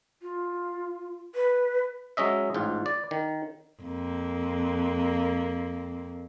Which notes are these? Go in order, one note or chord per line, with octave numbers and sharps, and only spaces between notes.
F4
B4
F#3 G#3 C#4 D#5 E5
A1 G#2 F4
D5
D#3
F2 A#3